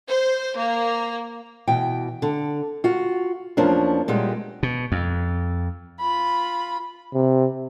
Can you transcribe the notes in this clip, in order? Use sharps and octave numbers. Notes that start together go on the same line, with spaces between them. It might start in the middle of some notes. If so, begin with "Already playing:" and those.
C5
A#3
B2 E3 G5
D3
F4 F#4
E2 F3 A#3 C#4 D4
A#2 G3 G#3 B3
B2
F2
F4 B5
C3